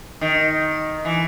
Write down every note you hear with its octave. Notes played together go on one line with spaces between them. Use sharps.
D#3
E3